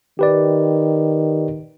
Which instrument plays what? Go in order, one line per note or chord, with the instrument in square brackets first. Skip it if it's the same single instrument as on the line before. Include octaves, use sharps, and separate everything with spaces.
[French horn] D#3 [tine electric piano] G4 B4 D5